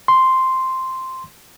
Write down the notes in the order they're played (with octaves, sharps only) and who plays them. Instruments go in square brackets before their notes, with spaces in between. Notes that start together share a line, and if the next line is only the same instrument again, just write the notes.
[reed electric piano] C6